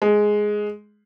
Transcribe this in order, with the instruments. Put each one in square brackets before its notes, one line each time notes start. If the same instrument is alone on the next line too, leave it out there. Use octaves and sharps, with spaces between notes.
[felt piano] G#3